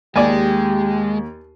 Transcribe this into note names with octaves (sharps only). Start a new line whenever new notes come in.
D#2 G#3 G4 D5 G#5